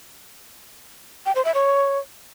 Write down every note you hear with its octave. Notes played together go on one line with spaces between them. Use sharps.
G5
C5
E5
C#5